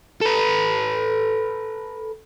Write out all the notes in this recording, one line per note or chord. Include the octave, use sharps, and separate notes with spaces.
A4 B4